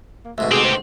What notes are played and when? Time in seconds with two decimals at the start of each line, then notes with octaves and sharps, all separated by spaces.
0.25 A#3
0.38 D2 G#2 B2 E5
0.51 C4 G4 G#4
0.64 C5